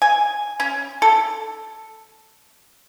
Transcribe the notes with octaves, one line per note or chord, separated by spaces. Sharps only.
G#5
C#4
A4